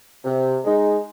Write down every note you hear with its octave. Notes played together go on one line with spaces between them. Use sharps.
C3
G#3 D#4